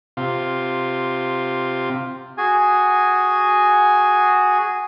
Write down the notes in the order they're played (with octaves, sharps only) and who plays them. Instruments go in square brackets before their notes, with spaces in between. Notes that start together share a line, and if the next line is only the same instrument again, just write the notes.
[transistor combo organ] C3 F4
[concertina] F#4 G#4 G#5